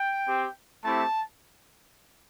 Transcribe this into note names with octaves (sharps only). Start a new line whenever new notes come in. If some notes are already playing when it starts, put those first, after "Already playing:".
Already playing: G5
C4 G4
A3 C4 E4 G4 A5